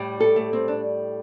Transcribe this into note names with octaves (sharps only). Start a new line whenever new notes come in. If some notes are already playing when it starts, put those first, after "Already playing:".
Already playing: A2 G3
A4
A3
C4
D4